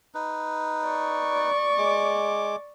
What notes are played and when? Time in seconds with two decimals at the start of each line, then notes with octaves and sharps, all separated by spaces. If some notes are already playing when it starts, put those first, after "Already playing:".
0.14 D#4 B4
0.86 D5 C#6
1.77 G#3 D6